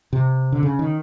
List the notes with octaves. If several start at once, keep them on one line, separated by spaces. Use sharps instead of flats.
C3
D3
C#3
D#3